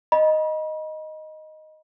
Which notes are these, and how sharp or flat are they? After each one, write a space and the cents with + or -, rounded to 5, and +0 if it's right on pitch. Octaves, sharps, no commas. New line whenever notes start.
D#5 +0 B5 -40